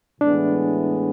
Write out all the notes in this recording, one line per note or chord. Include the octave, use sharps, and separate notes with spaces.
A2 E3 G#3 B3 D4